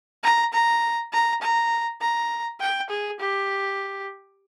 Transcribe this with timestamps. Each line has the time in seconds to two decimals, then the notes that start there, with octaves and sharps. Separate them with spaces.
0.23 A#5
0.53 A#5
1.13 A#5
1.42 A#5
2.01 A#5
2.60 G5
2.90 G#4
3.20 G4